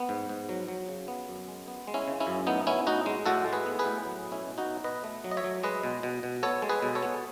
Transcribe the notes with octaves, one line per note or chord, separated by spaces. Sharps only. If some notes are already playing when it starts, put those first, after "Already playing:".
Already playing: B3
G#2
G#2
F#3
F#3
C#3
B3
F#2
G#3
B3
G#3
C#4 E4
C#3
C#4 E4
F#2
A2 B3 D#4
B3 C#4 E4
A2 D#4 F#4
G#3
A2 F#4 A4
G#3
G#4 B4
B3
G#4 B4
A2
F#3
B2
C#4 E4
B2
D#4 F#4
B2
B2 B4 D#5
A3
F#3
D#5
C#5 E5
F#3
G#3 B4 D#5
B2
B2
B2
B3 A4 C#5
G#3
G#4 B4
B2
A4 C#5
B3